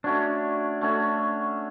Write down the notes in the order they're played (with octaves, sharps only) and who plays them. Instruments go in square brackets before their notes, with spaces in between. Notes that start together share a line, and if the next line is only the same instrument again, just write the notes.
[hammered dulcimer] A3 C#4 F#4 C#5 [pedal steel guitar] D4
[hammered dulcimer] A3 C#4 F#4 C#5